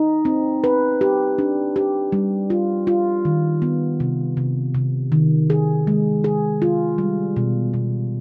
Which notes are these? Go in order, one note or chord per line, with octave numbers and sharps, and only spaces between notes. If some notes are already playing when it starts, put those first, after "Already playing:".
Already playing: D#4
C4
B4
G4
D4
G4
G3
F4
F4
D#3
B3
C3
C3
C3
D#3
G#4
G#3
G#4
F4
G3
B2
B2